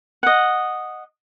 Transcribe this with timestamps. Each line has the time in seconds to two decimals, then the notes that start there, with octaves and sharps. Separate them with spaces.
0.23 D#5 F#5